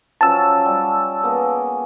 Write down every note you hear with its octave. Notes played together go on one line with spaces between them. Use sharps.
F3 F#3 C#4 A5 E6
G3
A#3 B3 G#4